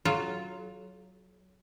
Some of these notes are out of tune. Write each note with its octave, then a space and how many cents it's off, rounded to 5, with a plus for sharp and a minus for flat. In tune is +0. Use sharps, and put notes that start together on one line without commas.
F#3 +5 F4 +0 A4 -45